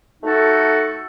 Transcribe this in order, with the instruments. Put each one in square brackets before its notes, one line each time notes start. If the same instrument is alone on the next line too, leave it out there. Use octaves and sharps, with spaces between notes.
[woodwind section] A3 D#4 F#4 A4